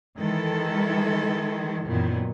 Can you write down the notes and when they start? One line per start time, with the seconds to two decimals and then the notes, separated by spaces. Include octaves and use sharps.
0.17 D#3 E3 G#3 A4
1.86 F#2 A#2 D#3 E3 B3